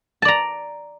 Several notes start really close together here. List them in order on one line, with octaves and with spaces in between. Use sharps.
A5 D5 A#5